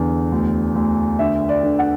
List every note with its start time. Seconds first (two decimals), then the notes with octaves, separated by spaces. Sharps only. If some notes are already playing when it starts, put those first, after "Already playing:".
Already playing: E2 D3
0.32 D2
0.75 D2
1.19 D3 E5
1.49 D5
1.63 D3
1.79 F#5